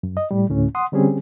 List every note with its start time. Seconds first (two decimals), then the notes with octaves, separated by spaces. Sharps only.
0.03 F#2
0.17 D#5
0.31 A2 G3
0.49 D2 A2 C#4
0.75 F#5 C6 D#6
0.92 D3 G3 C4 C#4 G4 G#4